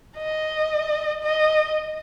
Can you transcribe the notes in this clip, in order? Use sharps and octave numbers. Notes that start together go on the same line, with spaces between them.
D#5
D#5